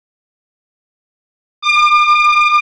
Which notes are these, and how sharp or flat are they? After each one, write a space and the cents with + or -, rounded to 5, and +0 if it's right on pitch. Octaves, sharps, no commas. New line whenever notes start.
D6 +40